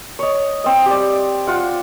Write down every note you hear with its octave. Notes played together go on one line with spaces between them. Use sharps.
C#5 D#5
C4 D#5
G4 D5
F4 F#5